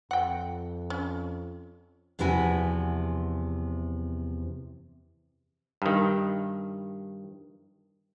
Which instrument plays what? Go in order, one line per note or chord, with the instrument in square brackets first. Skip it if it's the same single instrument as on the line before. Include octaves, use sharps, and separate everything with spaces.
[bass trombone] F2 [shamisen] F#5 G5
[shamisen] C#4
[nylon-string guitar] E2 C3 F3 E4 F#4 G#5
[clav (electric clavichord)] G2 D#3